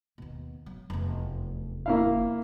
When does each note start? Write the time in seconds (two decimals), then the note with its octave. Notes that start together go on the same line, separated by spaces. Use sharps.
0.18 D#2 B2
0.66 F#3
0.90 F1 E2
1.86 A#3 E4 F5